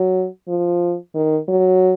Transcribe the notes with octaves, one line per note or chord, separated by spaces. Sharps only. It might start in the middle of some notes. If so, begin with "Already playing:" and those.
Already playing: F#3
F3
D#3
F#3